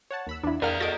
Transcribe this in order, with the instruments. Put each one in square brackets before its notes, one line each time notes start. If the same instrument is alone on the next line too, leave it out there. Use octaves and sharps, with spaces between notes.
[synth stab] C#5 F#5 A5
D#2 B5 E6
[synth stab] E2 [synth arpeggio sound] D4 E4
[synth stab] F2 F6 [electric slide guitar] G#4 D5 [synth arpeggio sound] A#4 F5
[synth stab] F#4 A4 D#5 [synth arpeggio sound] A6 D7